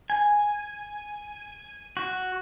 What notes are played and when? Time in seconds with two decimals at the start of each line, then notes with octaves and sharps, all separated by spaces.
0.10 G#5
1.97 F#4